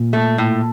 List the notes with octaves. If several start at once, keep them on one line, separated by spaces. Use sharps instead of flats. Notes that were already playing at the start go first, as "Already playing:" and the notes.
Already playing: A#2
A3
A2